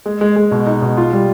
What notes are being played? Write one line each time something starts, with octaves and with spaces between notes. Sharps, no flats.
G#3
G#3
G#3
B2
D#4
B2
F4
G3